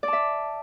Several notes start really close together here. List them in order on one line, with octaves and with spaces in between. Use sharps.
D5 A5 E5